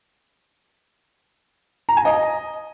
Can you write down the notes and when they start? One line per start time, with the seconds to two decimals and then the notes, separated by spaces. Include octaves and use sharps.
1.89 A#5
1.97 G#5
2.05 D#5